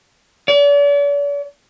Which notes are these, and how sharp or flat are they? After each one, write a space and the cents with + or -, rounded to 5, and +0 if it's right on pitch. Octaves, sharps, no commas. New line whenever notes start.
D5 -45